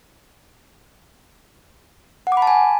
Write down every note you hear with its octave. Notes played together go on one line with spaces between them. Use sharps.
F#5
D6
B5
A5
G#5